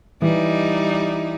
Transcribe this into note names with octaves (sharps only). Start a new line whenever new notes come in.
E3 G3 D#4